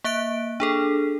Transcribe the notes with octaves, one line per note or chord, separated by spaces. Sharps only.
A#3 E5 F#6 D7
D4 G#4 A4